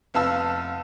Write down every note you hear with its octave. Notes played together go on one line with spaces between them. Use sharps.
F1 B3 F5 A5 E6